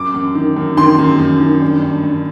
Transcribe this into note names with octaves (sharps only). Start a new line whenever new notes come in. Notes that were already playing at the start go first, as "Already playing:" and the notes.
Already playing: F#2 D6
F#2
D#3
F#2
D#3 C6
F#2
F#2
D#3
G2
G2
G2